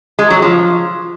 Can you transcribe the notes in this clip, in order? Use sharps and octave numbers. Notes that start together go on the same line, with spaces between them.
G#3
F#3
F3